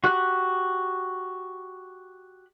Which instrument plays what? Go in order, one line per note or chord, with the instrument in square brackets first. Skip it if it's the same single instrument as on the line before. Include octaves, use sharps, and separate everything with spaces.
[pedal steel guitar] F#4 G4 F#6